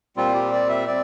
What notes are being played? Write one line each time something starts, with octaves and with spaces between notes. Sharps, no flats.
A#2 G3 C4 F4
G4
D5
E5
C4 D5